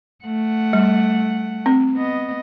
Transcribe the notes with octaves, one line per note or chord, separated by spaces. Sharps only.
A3 F#5
G3
C4
B3 D#5